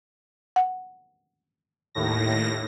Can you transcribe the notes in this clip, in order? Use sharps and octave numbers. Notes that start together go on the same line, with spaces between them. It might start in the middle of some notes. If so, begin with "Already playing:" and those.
F#5
D#2 A2 A#6